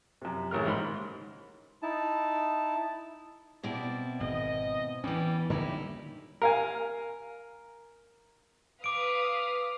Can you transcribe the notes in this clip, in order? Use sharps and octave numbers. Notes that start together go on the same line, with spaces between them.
F#2 C3
A1 C#3 A#4 F6
G#2 D#3 D#4 B5 C6
D#4 E4 A5
B2 C4 E4 D5
G#1 D#5
E2 E3 G3 C#4
D3 G3 A#3 C#4 D#4 E4 G4
A#4 F5 G#5
B4 F5 D6 D#6 D7